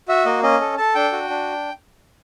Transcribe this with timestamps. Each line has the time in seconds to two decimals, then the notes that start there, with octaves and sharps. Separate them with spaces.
0.08 F#4 E5
0.26 A#3 D#5
0.43 C#4 D#5
0.61 A4
0.78 A4 A5
0.95 D4 G5
1.12 F#4
1.30 D4